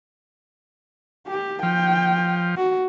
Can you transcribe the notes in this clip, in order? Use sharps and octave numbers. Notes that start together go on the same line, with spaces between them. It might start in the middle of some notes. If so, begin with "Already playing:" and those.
G4
F3 G5
F#4